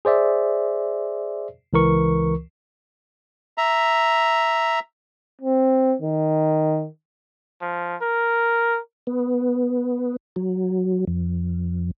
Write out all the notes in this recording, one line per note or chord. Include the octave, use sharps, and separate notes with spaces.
G#4 C5 D5 E5
C#2 E3 A#4 C#6
E5 A#5
C4
D#3
F3
A#4
B3
F#3
F2